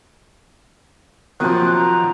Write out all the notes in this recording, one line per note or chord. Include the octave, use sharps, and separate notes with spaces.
C3 D#3 F3 F#3 A#3 F#6
A#5